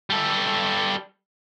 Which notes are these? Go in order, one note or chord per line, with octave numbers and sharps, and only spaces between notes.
G3 A4